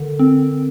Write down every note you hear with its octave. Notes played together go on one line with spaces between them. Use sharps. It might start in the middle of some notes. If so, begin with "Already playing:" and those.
Already playing: D3 A4 A#4
C4